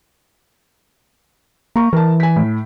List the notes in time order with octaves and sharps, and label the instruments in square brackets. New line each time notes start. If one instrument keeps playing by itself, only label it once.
[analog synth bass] A#3 [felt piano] A#5 C#6
[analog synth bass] E3 [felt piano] A#4 A5
[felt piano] G#5 B6
A2